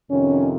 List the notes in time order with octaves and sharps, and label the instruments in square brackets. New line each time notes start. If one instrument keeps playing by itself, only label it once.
[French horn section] F2 C3 D#3 C#4